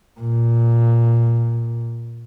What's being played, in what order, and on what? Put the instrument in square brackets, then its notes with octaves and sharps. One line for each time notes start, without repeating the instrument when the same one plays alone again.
[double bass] A#2